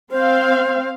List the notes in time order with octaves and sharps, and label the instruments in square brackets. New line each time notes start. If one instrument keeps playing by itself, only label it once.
[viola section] C4 F5 [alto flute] C5